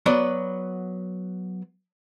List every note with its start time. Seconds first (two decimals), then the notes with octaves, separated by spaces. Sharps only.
0.06 F#3 B3 D5